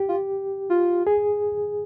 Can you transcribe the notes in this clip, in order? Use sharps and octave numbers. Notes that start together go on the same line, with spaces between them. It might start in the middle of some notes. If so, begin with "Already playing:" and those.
Already playing: G4
F4
F4
G#4